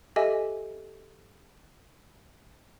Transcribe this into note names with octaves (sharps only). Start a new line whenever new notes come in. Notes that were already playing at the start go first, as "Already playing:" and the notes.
G4 A4 D#5 E5 G#5